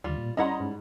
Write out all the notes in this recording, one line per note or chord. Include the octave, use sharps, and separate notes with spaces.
D#2 D3 G3 F4
A#2
G3 C#4 E4 D#5 F#5 A#5 C6
G#2